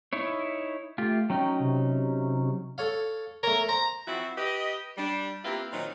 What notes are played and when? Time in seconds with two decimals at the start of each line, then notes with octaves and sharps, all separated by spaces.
0.13 D#4 E4 C#5
0.98 A3 F4 G4
1.30 F#3 C#4 D#4 G5
1.60 C3
2.78 A4 C#5 F5
3.43 A3 A#4 C#5
3.69 C5 A#5
4.07 F3 C4 E4 F#4
4.36 G4 B4 D#5
4.97 G3 D4
5.44 A#3 C4 E4 F4 G4 B4
5.72 A#2 D#3 F#3 C4 D#4